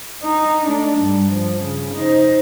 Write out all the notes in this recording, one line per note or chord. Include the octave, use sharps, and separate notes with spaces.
D#4
A3 D4
G2 G3
F3
C#3
D#4 C5